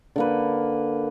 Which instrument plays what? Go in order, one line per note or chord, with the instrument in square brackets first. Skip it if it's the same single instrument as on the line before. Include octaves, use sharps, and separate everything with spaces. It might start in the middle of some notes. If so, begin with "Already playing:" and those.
[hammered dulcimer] D3 A#3 B4